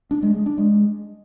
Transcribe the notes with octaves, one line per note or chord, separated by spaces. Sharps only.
D4
G#3
G#3
D4
G#3